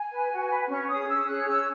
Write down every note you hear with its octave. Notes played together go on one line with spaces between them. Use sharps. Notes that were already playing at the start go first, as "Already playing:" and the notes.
Already playing: G#5
B4
F#4
B4
C#4 C#6
G#4 C#5 D#6
C#4 E6
G#4 C#5 F#6
C#4 E6